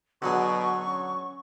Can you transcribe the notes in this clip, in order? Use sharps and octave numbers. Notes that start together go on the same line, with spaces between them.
B2 D3 F#3 G#4 C#6
C#4